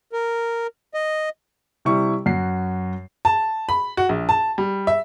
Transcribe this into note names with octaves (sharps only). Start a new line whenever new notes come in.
A#4
D#5
C3 G3 E4 C#6
F#2 F#4 C7
A5
B5
F#4
A#1
A5
G3
E5